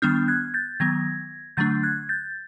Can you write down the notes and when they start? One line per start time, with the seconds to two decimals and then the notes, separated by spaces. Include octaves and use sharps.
0.02 D#3 G3 B3 D4 F6 G6
0.28 F#6 G#6
0.54 G6 A6
0.80 D#3 F#3 B3 G#6 A#6
1.57 D3 F#3 A3 D4 G6 A6
1.83 F#6 G#6
2.09 G6 A6